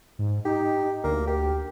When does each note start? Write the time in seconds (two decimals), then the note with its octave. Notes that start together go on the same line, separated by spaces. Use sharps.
0.19 G#2
0.45 D#4 G4
1.04 D2 A#3
1.27 G4